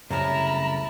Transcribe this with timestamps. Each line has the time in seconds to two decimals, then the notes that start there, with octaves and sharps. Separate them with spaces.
0.11 C2 F#2 C#3 A3 E4 A5 A#5 F6